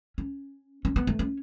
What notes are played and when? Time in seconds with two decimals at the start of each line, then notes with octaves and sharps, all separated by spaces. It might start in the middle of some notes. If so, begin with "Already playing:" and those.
0.18 C#4
0.85 C#4
0.96 B3
1.07 A3
1.19 C#4